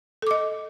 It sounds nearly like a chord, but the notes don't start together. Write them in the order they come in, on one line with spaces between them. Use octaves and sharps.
A4 D6 D#5